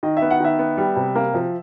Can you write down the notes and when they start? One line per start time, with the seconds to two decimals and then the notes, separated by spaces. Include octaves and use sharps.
0.03 D#3 D#5
0.17 E5
0.22 B3
0.31 F#5
0.40 D#3 E5
0.59 B3
0.77 G3
0.96 C3
1.15 A#3
1.34 F3